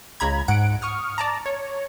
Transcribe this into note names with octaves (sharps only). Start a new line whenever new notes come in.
C#2 C#3 A#5 B5 G#6
G#2 F#5 D7
C#6 D#6 F6
D5 A5 A#5
C#5